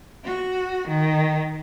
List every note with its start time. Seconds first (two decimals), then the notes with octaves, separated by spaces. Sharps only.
0.25 F#4
0.88 D#3